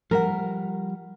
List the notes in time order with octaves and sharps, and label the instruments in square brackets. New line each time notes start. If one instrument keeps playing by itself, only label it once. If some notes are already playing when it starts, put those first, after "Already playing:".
[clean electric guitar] F3 G3 F#5 [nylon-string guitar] A#4